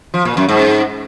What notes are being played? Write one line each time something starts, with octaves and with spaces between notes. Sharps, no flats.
F3
A#2
F#2
G#2